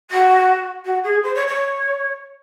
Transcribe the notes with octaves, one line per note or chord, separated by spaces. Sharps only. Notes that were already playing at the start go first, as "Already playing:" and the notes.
F#4
F#4
G#4
C5
C#5
C#5